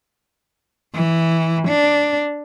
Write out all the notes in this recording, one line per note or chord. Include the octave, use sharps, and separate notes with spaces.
E3
D4